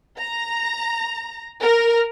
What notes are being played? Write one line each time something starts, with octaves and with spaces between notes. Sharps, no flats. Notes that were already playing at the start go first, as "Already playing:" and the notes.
A#5
A#4